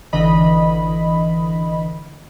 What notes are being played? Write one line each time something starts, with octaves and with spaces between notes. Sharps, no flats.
G#1 D3 E3 D#5 B5